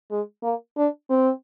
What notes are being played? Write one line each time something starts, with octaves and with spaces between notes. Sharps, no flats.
G#3
A#3
D4
C4